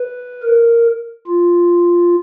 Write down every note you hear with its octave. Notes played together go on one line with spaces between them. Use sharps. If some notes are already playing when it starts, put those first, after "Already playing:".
Already playing: B4
A#4
F4